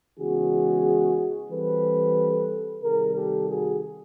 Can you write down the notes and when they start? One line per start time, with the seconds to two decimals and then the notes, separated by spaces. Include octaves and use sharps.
0.18 C#3 E3 G#3 B3 F#4 G#4
1.50 E3 G3 C4 A4 B4
2.82 C3 D#3 G3 G#4 A#4
3.15 G4 A4
3.48 F#4 G#4